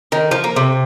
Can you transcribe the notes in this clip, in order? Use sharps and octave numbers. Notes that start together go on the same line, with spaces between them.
D#3
F3
A#3
C3